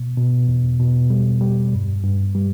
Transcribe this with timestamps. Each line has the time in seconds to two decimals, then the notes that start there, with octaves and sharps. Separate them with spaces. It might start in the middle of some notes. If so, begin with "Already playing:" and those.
Already playing: B2
0.18 B2
0.47 E2
0.80 B2
1.10 G3
1.41 G3
1.73 G2
2.03 G2
2.35 G3